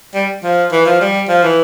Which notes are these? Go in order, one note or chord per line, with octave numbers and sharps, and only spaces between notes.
G3
F3
E3
F3
G3
F3
E3